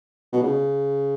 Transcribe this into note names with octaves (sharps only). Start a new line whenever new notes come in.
B2
C#3